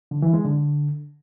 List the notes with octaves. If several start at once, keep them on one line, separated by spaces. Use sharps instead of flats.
D3
E3
G#3
D3